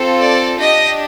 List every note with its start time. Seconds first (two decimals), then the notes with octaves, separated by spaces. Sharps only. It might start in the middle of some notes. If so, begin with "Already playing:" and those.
Already playing: C4 F4 A4
0.20 D5
0.59 D4 G4 D#5